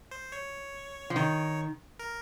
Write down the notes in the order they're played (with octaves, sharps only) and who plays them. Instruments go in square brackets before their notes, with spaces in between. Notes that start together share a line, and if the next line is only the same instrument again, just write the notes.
[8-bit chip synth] C5
C#5
[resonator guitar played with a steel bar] F3
[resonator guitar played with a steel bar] D#3 [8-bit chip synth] C#5
[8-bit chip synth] A#4